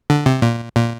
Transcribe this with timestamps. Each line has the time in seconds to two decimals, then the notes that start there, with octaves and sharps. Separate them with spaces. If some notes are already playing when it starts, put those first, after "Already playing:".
0.10 D3
0.26 C3
0.42 A#2
0.75 A#2